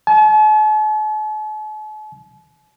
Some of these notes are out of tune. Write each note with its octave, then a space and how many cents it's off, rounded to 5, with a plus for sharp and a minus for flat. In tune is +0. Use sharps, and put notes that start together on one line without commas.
A5 -45